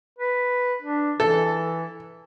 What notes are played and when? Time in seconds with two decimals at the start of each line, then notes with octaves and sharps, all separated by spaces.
0.19 B4
0.82 D4
1.20 E3 A4